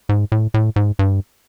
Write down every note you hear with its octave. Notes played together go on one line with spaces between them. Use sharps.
G#2
A2
A2
G#2
G2